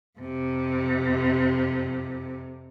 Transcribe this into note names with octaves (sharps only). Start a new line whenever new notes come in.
F2 C3